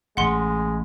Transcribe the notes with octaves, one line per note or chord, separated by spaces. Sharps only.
A1 G#3 F#5 C6